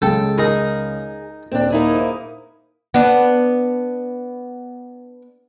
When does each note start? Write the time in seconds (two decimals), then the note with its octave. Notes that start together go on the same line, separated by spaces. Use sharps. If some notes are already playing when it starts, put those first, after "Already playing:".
0.02 C#2 C#3 G#3 A4 G5
0.38 D#4 G#4 A#4
1.52 D#1 C4 D4
1.70 A#3 D#4 E4 G#4
1.94 C5 D#6
2.94 B3 D4